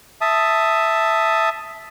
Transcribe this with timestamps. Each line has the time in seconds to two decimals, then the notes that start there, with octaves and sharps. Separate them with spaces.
0.21 E5 A5 D#6